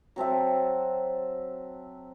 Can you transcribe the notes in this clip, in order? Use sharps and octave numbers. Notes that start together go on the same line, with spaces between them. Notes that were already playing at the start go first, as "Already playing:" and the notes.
F#3 C4 A4 E5